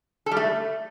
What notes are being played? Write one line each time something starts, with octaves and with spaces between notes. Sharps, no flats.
A4
G3
A3